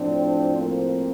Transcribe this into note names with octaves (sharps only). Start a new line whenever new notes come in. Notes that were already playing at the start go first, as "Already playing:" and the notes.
Already playing: A2 F3 C4 D4
A#3 C4